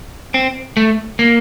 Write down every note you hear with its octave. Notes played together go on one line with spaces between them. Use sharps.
C4
A3
A#3